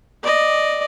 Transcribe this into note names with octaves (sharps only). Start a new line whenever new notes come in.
D5 D#5